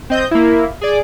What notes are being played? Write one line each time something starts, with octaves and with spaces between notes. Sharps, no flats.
C4 D#5 G6
A#3 E4
G#4 D5